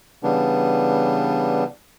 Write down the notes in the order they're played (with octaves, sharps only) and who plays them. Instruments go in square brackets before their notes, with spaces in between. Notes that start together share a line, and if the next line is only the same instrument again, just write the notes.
[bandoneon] C#3 E3 G3 B3 D4